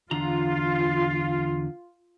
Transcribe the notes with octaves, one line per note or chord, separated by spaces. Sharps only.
E2 D3 F4 A#5